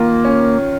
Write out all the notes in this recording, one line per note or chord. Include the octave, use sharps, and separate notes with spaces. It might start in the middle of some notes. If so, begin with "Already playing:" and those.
Already playing: D#3 A#3 F4
C#4